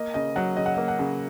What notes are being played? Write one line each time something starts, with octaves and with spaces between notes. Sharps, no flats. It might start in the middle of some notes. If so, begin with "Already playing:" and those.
Already playing: A#3 D#5
C#3 D#5
F#3 F#5
C#3 D#5
F#5
A#3 D#5
F#5
C#3